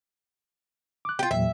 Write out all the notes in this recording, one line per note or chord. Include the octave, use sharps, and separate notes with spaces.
D6 F#6
F4 G4 G6
E2 A#2 F#3 E5